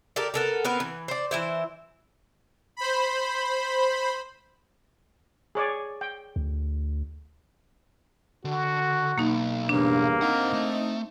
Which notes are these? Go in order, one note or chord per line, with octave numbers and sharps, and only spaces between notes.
G4 A4 A#4 D5
B3 A4 A#4
B3 C4 A#4 B4
E3
C5 D5
E3 E4 C5
C5 B5
G#4 C#5 D5
G5
D2
D3 F#4
B1 A#3 D#4
E2 G2 C#3 A#3 D4
C4 D#4 C5 F#5
A3